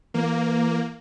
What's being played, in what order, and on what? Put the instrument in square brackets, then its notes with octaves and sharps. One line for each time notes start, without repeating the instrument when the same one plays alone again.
[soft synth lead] E3 [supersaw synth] A#3